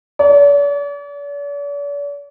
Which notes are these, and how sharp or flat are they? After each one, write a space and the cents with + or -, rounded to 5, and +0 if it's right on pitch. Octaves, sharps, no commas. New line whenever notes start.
D5 -45